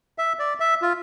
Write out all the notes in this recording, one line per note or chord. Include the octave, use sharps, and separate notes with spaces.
E5
D5
E5
F4